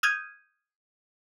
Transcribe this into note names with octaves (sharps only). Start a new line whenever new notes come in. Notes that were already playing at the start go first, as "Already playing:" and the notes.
D#6 F6 G6 G#6 D#7